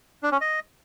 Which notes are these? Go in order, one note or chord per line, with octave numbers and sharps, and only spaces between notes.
D4
C#4
D#5